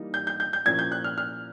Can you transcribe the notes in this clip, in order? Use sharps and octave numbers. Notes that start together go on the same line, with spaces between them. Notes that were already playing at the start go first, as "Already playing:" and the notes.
Already playing: E3 G3 A#3 D#4
G6
G6
G6
G6
A#2 F3 A#3 C#4 E4 G#6
G6
F#6
F6
F6